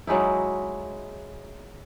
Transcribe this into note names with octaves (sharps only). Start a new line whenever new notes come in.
F#3 G#3 D#4 E4